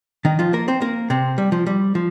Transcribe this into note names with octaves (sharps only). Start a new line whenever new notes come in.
D#3 D#4
F3 F4
A#3 A#4
C4 C5
A#3 A#4
C3 C4
G3
F3
G3
F3